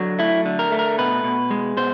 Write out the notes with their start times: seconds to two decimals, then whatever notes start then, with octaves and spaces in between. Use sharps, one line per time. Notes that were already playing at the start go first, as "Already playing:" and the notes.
Already playing: D3 F#3
0.19 A3 E4
0.45 D3
0.59 A#4
0.72 A3
0.79 A#4
0.98 B2 B4
1.24 B2
1.50 G#3
1.77 B2 C5